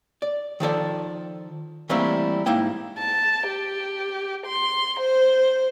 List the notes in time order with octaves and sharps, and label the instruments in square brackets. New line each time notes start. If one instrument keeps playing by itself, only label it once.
[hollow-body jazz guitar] D5
D#3 F3 A4 D5
E3 G3 A3 A#3 C4 E4
G#2 A#3 D#4 E4 G5
[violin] A5
G4
C6
C5